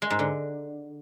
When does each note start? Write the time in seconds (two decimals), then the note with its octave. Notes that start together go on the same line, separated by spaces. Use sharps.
0.02 G#3
0.10 G#2
0.19 D3